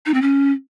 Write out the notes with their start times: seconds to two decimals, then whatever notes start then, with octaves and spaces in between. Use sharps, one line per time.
0.06 D#4
0.14 C4
0.22 C#4